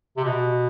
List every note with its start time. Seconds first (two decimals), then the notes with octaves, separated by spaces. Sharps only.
0.17 C3
0.25 B2